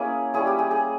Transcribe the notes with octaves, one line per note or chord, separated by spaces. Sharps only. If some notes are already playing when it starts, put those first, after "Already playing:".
Already playing: A#3 C#4 E4 G#4
G3 C#4 E4 G#4
G4
G#4
G#4